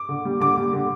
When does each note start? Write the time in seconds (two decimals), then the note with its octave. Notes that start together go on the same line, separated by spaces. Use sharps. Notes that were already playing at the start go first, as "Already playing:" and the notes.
Already playing: D6
0.09 D3
0.25 G3
0.40 D3 D6
0.58 G3
0.73 D3